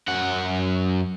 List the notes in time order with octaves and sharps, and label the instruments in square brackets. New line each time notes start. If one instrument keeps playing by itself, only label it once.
[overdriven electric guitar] F#2 F#5